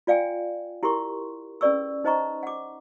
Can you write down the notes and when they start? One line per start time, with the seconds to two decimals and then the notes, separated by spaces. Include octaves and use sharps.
0.07 F4 D5 F5 G5 G#5
0.83 E4 G4 A#4 C6 C#6
1.61 C#4 G#4 B4 D5 C#6 E6
2.04 D#4 C5 D#5 A#5 C#6
2.43 F#5 D6